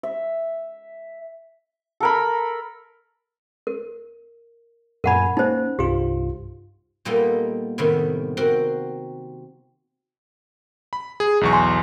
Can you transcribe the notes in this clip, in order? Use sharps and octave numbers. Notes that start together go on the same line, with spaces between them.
E5
A4 A#4 B5
A#4
F#2 A#2 A#4 F#5 G#5 B5
A#3 C#4 D#4 C5
C2 G2 F4 G4
A#2 G3 A#3 B3 D#4 A4
A2 C3 D#3 G3 A3 B3
C4 F#4 A#4 C5
B5
G#4
B1 E2 C#6
G#5 C6